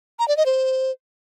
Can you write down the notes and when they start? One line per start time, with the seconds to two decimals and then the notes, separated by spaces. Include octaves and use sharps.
0.19 A#5
0.28 D5
0.37 D#5
0.46 C5